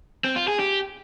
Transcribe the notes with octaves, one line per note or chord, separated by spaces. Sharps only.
C4
F4
G#4
G4